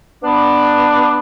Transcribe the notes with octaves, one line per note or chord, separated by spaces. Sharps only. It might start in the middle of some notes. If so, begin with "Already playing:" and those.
B3 D4